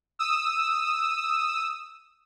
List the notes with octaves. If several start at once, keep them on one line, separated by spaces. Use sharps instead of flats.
D#6 E6